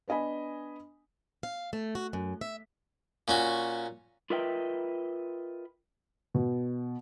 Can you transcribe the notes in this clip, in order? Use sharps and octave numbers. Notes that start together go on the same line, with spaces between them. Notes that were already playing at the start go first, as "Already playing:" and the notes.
B3 D4 D#5 G#5 B5
F5
A3
F#4
F#2
E5
A#2 C#4 F#4
F4 A#4 B4 D#5 E5 G5
B2